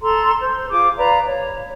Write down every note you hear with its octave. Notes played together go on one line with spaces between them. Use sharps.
A4 A#5 C6
C5
F4 G#4 D6
B4 D5 F5 A#5
C#5